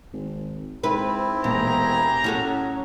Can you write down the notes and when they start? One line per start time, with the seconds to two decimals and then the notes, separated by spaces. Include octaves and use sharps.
0.13 G#1
0.83 G#2 C4 E4 B4
1.44 E1 A#2 G4 G#4 A#5
2.24 A2 F#3 C#4 F#4 A4